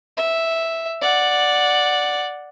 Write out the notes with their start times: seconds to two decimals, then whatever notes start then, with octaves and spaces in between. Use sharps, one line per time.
0.17 E5
1.02 D5 F#5